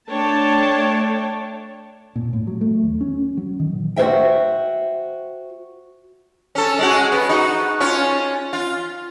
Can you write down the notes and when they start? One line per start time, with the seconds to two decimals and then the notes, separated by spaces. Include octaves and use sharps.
0.10 A3 D4 C#5 G5 A5
2.16 A#2
2.33 A2
2.47 F#3
2.61 A3
2.83 D#2
3.01 C#4
3.37 F#3
3.60 D#3
3.73 A#2
3.96 F#4 A4 C5 E5 G5
6.55 C#4 A4
6.79 G#3 C#4 F#4
7.12 B3
7.29 D#4 F#4
7.80 C#4 F4
8.53 F4